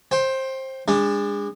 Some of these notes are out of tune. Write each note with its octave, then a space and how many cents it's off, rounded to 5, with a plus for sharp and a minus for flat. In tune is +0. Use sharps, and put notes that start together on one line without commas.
C5 +20 G5 +0
G#3 -30 D4 +0